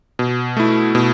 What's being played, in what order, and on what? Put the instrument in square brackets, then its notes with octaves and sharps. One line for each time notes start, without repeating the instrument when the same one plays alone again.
[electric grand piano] B2
A3 E4
B2